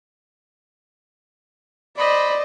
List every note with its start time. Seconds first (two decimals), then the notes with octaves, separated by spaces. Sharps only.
1.98 C5 D5 D#5 B5